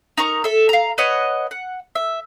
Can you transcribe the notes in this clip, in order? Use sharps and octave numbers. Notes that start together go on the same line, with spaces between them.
D#4 A#4 A#5 C#6
A4 E5
F5 A#5
B4 C#5 D#5 F#5
F#5
E5